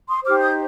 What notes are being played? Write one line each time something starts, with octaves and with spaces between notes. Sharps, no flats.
C6 D#6
D#4 G4 C5 D6 F6
D#6 G6